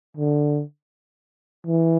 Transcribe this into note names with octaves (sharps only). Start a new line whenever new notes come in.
D3
E3